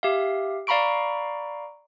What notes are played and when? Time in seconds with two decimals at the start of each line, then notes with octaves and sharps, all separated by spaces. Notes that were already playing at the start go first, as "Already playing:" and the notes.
0.03 G4 E5 F5
0.67 D5 F5 A#5 B5 C#6 D7